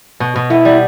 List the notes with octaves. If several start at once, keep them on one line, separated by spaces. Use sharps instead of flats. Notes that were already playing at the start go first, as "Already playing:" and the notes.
B2
B2
B3 E4
G3